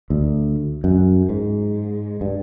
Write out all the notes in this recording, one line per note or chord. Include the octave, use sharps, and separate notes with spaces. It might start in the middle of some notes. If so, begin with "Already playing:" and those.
D2
F#2
G#2
G2